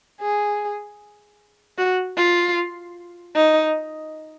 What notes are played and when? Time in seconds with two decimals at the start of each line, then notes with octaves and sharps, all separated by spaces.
0.21 G#4
1.78 F#4
2.17 F4
3.35 D#4